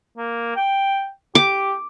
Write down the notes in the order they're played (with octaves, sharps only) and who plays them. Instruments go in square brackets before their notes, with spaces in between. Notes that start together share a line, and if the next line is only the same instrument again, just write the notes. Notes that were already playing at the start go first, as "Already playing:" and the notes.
[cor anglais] A#3
G5
[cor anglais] G4 [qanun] D6